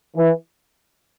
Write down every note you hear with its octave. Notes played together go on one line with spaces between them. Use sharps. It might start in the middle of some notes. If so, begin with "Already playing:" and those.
E3